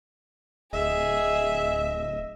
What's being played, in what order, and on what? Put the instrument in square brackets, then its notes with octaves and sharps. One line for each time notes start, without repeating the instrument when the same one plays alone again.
[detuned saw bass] D1 [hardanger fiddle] G#4 [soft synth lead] D#5 [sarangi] E5